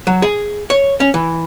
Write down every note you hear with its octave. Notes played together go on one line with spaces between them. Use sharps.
F#3
G#4
C#5
C#4
E3